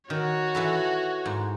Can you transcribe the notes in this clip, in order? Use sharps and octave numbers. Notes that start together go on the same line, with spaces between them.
D#3 F#4 C#5
E3 A4 B4
G#2